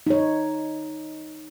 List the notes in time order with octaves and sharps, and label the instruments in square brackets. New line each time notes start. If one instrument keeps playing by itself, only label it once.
[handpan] D#4 C#5